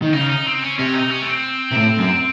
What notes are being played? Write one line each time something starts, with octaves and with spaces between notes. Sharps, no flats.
D#3
C#3 D#4
D#4
C4
C#4
C3 C#4
D#4
C#4
A3
C4
C3
A2
F#2